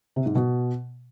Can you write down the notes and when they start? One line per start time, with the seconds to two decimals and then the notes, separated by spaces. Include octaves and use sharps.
0.16 C3
0.26 G#2
0.35 B2